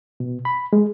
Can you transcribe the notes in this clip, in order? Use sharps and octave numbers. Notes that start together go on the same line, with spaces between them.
B2
B5
G#3